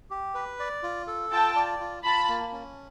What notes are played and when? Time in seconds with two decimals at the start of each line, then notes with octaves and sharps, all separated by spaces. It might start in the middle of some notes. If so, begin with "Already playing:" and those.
0.10 G4
0.35 B4
0.59 D5
0.83 F4
1.07 A4
1.32 F4 G5 A5
1.56 D5
1.80 F4
2.04 F4 A5 B5
2.28 A#3
2.53 C#4